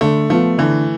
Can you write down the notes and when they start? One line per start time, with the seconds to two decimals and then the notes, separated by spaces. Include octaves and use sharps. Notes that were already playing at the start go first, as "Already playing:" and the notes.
0.01 D3 A3
0.30 F3 A3 B3 F4
0.58 D3 E3